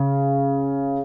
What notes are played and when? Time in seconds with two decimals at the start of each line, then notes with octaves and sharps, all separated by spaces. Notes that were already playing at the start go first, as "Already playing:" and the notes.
Already playing: C#3